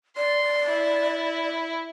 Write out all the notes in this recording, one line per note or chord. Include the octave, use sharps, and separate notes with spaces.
D5 C6
E4